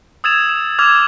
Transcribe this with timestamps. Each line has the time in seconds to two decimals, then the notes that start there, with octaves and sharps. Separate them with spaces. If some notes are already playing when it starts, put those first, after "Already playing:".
0.24 D#6 E6 G#6 A6 E7 F7
0.49 E7
0.79 D6 E6 F6 G#6 F7